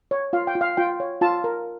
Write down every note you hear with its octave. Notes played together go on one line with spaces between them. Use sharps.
C#5
F4 F5
G5
F4
F5
F4 G5
C#5
F4 A5
A#4